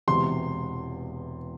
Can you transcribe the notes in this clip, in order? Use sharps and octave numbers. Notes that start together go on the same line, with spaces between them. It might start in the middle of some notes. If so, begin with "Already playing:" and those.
E1 E2 C3 C6